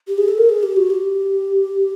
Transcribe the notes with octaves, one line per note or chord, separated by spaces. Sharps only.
G4
G#4
A4
A#4
G#4
G4
F#4
G4